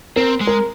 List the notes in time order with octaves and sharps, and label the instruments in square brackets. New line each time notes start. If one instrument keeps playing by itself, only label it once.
[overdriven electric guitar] C4 [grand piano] A#4
[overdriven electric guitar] G#3
[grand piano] A#4